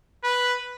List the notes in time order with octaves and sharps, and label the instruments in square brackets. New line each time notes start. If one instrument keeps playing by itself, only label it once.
[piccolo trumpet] B4